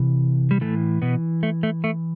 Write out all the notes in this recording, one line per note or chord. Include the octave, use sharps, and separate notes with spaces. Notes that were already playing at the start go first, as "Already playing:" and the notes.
Already playing: C3 E3
G3
A2 E3 A3
B2 B3
A3
A3
A3